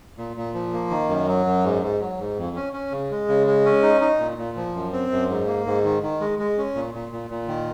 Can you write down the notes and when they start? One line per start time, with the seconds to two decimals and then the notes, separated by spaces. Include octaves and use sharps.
0.18 A#2
0.37 A#2
0.54 F3
0.73 A#3
0.91 D#3
1.09 F#2
1.28 F#3
1.46 F#2
1.64 G#2
1.82 G#2
2.01 F#3
2.19 G#2
2.38 F2
2.56 C#4
2.73 C#4
2.91 C#3
3.11 G#3
3.28 C#3
3.47 G#3
3.66 C#4
3.83 D#4
4.01 D#4
4.19 A#2
4.38 A#2
4.57 F3
4.75 F#2
4.93 C4
5.11 F#2
5.30 G#2
5.47 A#3
5.66 G#2
5.85 D#3
6.03 D#3
6.20 G#3
6.39 G#3
6.58 C#4
6.75 A#2
6.94 A#2
7.12 A#2
7.31 A#2
7.48 D#3